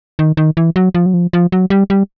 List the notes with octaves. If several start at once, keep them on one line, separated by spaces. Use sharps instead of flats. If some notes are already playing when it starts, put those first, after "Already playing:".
D#3
D#3
E3
F#3
F3
F#3
F3
F3
F#3
G3
G3